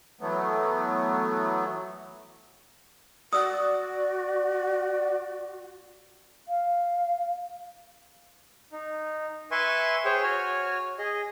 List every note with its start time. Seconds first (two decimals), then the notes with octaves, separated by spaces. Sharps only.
0.21 E3 F#3 A3 B3
3.33 F#4 D5 D#6 E6
6.48 F5
8.72 D#4
9.51 B4 E5 G#5 C6 C#6
10.05 G#4 C5 C#5 G5
10.23 F#4 C#5 G#5 F6
10.99 G#4 D#5